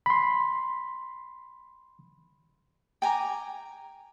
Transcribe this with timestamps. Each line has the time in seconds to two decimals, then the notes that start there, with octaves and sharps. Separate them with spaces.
0.06 B5 C6
3.02 G5 G#5 A#5 D6